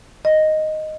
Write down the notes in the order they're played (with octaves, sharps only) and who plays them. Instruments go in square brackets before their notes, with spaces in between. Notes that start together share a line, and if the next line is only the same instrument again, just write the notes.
[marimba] D#5